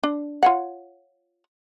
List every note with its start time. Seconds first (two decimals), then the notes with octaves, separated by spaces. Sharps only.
0.03 D4
0.43 F4 C#5 F#5